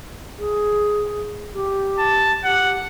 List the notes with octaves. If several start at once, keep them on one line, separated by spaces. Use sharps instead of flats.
G#4
G4
A5
G4 F#5